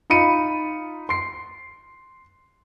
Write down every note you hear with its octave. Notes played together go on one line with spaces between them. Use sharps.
D#4 F4 B5 C#7 D#7
C6 C7